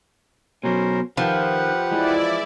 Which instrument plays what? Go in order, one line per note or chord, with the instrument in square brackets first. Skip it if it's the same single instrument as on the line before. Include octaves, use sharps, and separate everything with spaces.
[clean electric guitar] B2 F#3 [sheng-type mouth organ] C#4 A#4 C5
[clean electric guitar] D#3 [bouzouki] F3 [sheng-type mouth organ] G4 B4 F#5
[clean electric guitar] E3 G#3 [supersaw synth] E4 D5